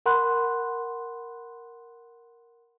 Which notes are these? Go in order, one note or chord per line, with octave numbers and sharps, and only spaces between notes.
A#4 F#5 B5 C6 F#6